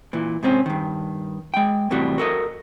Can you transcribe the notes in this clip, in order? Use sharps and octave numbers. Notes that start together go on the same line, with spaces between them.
A#2 E3
G#2 C3 C4 C#4
G2 D#3
G#3 G5
E2 A2 C3 G3 F#4
F#4 A4 A#4 D#5